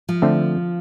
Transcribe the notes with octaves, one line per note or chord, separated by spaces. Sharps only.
F3
D3 A3 C4